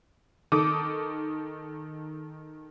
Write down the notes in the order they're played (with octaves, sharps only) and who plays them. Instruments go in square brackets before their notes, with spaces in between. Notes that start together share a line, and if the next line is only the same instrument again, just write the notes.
[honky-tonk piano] D#3 A4 D6 D#6